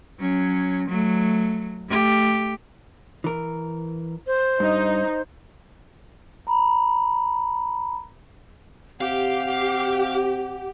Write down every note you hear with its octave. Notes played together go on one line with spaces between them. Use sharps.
F#3 C#4
F#3 A3
A3 G4
E3 A#4
C5
G2 D#4
A#5 B5
C3 G4 F5 F#5